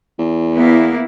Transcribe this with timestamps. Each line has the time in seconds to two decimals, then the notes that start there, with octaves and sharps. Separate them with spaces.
0.18 E2
0.55 A#3 B3 E4